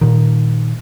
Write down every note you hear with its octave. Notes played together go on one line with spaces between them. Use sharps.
A#2 D#3